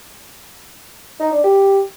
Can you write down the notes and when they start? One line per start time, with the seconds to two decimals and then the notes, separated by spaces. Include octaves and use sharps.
1.20 D#4
1.32 D4
1.44 G4